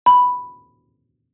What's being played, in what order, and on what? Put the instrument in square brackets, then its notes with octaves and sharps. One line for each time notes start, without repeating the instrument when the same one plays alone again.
[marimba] B5